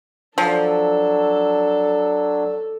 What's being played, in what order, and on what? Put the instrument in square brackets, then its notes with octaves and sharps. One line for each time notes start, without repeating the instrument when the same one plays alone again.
[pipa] F3 [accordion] F#3 D4 E6 [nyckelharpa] A4